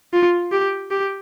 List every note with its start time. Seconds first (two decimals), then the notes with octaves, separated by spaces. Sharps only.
0.13 F4
0.52 G4
0.91 G4